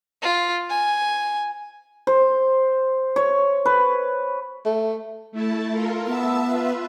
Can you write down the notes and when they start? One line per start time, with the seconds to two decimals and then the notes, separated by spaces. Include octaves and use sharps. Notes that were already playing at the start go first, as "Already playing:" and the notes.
0.22 F4
0.70 G#5
2.07 C5
3.16 C#5
3.66 B4
4.66 A3
5.32 A3 E4 A5
5.72 F4 A4 A#4
6.06 B3 E5 A5 E6
6.46 F4 B4 E5